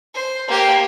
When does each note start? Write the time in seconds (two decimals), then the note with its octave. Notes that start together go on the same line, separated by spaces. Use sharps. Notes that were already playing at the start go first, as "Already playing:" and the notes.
0.14 C5
0.48 A#3 G4